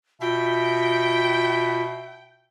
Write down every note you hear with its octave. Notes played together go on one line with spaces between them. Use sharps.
B2 F4 E5 G5